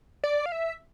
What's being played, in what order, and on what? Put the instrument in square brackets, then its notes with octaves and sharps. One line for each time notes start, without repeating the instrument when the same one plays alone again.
[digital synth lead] D5
F5
E5